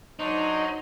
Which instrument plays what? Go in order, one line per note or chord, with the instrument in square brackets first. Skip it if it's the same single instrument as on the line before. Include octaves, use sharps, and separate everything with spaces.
[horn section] F#3 D4 [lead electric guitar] D#4 [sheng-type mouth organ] C5 C#5